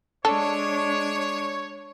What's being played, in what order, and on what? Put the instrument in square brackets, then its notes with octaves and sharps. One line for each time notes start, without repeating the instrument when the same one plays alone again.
[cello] G#3 D4 [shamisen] A4 [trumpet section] C#5